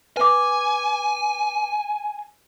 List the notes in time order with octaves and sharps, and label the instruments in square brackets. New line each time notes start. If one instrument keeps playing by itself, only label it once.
[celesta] B4 D6 [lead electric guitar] G#5